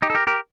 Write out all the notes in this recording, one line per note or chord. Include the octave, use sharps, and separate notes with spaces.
D#4 G4
A4
G4 A#4
G4 A#4